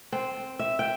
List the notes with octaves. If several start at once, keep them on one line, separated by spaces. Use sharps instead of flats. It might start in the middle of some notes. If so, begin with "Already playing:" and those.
C4
E5
G5